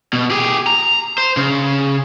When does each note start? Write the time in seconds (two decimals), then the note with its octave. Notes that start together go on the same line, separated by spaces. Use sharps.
0.13 B2
0.31 G4 G#4
0.67 A#5
1.18 C5
1.37 C#3